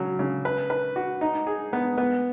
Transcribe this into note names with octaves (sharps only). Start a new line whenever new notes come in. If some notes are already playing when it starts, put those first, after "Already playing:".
Already playing: C#3 F#3
C#3
B4
B4
F#4
D#4
G#4
B3
B3